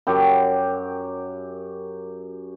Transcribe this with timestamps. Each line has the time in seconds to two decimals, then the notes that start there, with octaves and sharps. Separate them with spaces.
0.07 F#2 G4